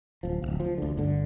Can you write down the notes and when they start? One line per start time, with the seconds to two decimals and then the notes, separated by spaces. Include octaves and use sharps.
0.23 D1 F3
0.42 D1 A#1
0.60 F3
0.78 D2 D3
0.97 G1 D3